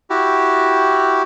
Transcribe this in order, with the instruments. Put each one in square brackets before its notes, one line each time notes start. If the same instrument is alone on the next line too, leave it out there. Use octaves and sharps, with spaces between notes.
[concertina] E4 F#4 G4